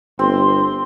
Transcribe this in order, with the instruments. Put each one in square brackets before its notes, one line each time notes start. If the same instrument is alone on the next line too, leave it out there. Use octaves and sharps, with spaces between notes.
[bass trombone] G1 [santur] C4 [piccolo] C6